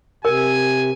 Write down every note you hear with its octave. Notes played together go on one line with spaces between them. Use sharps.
C3 A#4 G#5